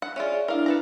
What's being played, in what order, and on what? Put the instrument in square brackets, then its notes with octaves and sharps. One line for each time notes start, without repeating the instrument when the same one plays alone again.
[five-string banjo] F#5
[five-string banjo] C#4 F4 [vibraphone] G#4 D5 E5
[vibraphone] D4 E4 [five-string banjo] A#4 F5
[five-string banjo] A4 B4 A#5